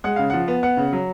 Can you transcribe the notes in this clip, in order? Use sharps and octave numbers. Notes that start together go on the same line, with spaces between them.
G#3 F#5
C#3 F5
F3 F#5
B3
B3 F#5
C#3
F#3